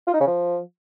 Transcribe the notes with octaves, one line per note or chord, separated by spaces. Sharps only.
F4
D#4
C#3
F3